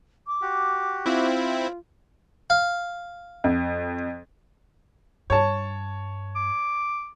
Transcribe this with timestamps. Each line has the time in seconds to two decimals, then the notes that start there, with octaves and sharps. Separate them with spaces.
0.27 D6
0.42 F#4 G4
1.06 C4 E4 F4
2.50 F5
3.44 F2
5.30 G2 C#5 A5
6.36 D6